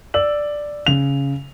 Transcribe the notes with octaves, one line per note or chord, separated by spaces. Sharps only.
D5 E6 F#7
C#3 F7